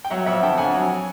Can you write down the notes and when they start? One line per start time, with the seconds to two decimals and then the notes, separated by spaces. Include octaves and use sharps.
0.05 G5
0.10 F#3 E5 F#5
0.26 F2 E5 F#5
0.43 D3 G5 A5
0.58 F2 F#5 G#5
0.74 F#3